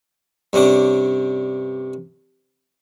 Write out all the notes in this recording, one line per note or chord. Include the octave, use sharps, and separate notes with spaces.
G2 C3 C#4 D4 F#5